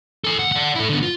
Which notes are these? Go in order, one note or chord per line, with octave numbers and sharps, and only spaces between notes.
A4 G#5
D2 F#5
D5 F#5
E4 A4
D3 B3
F4